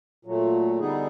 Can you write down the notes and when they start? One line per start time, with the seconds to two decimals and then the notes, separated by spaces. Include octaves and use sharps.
0.25 A#2 F#3 A3
0.79 D3 G3 B3 D#4 G#4